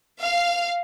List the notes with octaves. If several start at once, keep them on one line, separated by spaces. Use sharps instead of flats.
F5